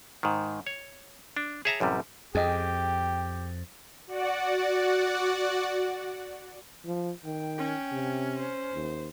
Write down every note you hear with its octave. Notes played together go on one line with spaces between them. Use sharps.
G#2 D#3
C#5
D4
G#4 C#5 E5 A5 A#5
A1 F#2 C3 G3
F2 G4 G#4 D#5 G5
F#4 D5 F#5
F3
D#3 G5
C#4
C3
C5
D#2